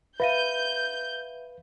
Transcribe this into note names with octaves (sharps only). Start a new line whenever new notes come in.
B4 E5 F5 G6 D#7